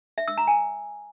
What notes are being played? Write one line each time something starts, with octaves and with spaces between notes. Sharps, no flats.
E5
E6
A#5
G#5